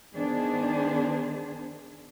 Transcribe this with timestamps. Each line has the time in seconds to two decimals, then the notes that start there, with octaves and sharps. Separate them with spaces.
0.14 D#3 B3 D4 G#4 C5